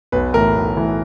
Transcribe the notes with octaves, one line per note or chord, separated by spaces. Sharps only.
B1 B4
A2 E3 A#4
B1
A2 E3